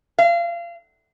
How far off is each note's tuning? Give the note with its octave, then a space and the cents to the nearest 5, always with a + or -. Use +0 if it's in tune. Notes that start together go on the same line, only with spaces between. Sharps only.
F5 -30